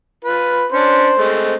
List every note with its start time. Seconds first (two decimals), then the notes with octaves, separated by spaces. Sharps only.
0.24 F4 B4
0.72 C#4 D4 C5
1.18 G#3 A3 C4